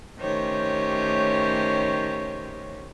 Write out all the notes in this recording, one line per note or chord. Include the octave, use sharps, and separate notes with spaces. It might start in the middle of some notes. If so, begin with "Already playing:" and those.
D#3 A3 C#4 G4 C5 C#5